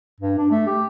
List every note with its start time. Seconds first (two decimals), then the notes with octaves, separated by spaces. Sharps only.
0.20 G2
0.38 D4
0.51 A3
0.67 G4